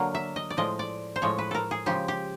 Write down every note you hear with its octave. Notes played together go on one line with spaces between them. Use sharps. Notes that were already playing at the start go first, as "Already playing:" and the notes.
Already playing: D3 F#3 A#3
E5
D#5
D5
A2 F3 G#3 D#5
D5
C5
A2 F3 G#3 C#5
B4
A4 A#4
G#4
C#3 F3 G#3 G4
G4